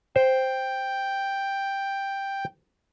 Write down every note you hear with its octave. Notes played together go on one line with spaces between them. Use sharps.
C5 G5